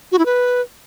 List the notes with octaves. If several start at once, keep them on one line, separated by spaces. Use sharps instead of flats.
F#4
E4
B4